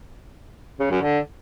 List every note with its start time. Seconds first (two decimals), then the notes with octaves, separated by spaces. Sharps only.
0.80 C#3
0.91 F#2
1.02 D3